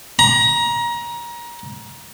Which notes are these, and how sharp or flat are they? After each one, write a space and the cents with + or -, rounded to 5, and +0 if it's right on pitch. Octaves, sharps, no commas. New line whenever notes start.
A#5 +25